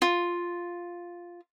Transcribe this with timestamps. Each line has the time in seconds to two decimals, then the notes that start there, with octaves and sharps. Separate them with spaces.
0.02 F4